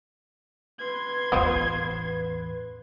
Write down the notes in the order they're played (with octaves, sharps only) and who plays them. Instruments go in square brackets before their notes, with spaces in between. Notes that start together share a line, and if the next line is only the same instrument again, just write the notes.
[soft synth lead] B4 [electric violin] C6 G#6
[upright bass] A1 E2 [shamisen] B3 F4 C5